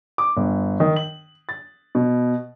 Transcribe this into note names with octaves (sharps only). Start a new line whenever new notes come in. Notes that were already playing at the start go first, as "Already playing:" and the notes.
D6
G1
D#3
F#7
A6
B2